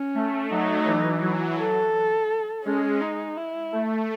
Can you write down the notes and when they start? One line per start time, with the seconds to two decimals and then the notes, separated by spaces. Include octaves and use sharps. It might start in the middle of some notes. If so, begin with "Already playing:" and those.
Already playing: C#4
0.15 A3
0.51 F#3 D#4
0.86 E3
1.22 F#3
1.58 A4
2.64 G#3 C#4
3.01 D#4
3.37 E4
3.72 A3